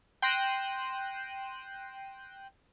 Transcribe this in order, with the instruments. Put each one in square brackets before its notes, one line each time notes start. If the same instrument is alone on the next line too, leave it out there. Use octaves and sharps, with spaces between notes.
[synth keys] G5 C6 F#6 A#6 D#7 E7